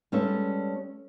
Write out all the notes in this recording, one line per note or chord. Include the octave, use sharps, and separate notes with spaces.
G3 G#3 C#4 A4 B4 E5